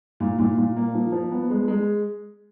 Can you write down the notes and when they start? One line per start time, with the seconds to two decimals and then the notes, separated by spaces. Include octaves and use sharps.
0.20 A#2
0.38 A#2
0.57 A#2
0.76 A#3
0.94 F3
1.12 F3
1.32 B3
1.50 G#3
1.68 G#3